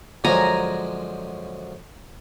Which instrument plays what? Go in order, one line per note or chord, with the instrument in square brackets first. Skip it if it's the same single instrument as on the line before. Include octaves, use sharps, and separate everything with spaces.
[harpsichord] F#2 D3 F3 G#3 C#4 [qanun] G#5 A#5